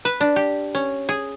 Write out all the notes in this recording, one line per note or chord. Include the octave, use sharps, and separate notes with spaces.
B4
D4
G4
C#4
G#4